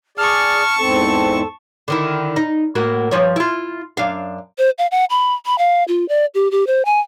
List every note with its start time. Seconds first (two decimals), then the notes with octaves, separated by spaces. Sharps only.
0.18 G#4 D5 A5 C#6 F6
0.79 E2 G#2 C4 A4
1.88 D3 D#3 E4
2.36 D#4
2.75 A2 A#3 F#4
3.11 G2 F3 C#5
3.36 E4 F4
3.97 F#2 D4 F5
4.58 C5
4.78 F5
4.91 F#5
5.10 B5
5.46 B5
5.58 F5
5.88 F4
6.09 D5
6.35 G4
6.51 G4
6.67 C5
6.85 G#5